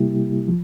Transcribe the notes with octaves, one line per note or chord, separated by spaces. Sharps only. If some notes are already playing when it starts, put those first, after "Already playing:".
Already playing: C3 G3 A#3 E4 G4
F3